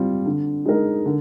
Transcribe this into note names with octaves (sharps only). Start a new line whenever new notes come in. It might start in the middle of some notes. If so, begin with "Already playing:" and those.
Already playing: G3 C4 F4
D3
G#3 D#4 A#4
D3